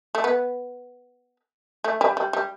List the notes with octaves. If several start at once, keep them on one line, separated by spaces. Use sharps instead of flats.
A3
B3
A3
G3
G3
G3